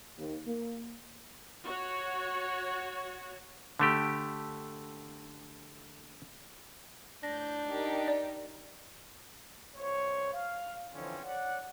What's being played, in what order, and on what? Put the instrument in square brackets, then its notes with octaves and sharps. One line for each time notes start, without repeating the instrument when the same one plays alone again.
[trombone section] D#2
A#3
[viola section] F#4 C#5
[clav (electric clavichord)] D3 A3 G4
[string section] A2 G6 [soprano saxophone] D4 [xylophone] A#6
[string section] D#4 G4 A#4
[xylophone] D5
[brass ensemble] C2 C5 C#5
F5
D3 E3 F3 C4 C#4
C#5 D5 F#5